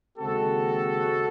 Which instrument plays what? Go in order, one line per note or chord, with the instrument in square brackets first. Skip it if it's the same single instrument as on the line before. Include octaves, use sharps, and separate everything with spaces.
[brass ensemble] D#2 C#3 G#3 C4 F#4 A4